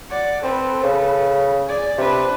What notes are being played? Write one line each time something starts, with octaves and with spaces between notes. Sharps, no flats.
D5 F#5
C4 A4 B4
C#3
G#4 D5
C3 D4 B4